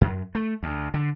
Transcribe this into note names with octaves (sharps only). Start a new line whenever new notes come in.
F#2
A3
D2
D3